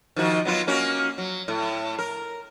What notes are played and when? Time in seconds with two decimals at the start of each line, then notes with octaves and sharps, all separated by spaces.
0.16 D#3 F3 F#4
0.45 F#3 B3 F4
0.67 A#3 C#4 F#4
1.18 F#3
1.48 A2
1.99 A#4